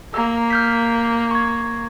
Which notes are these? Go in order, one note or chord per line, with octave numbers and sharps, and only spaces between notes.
A#3 A#5 E6
F6 G6 B6
C#6 G#6